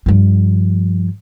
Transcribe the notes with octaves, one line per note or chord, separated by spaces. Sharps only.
G2 F3